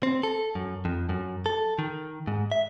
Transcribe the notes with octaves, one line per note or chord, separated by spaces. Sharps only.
C4
A4
F#2
F2
F#2
A4
D#3
G#2
E5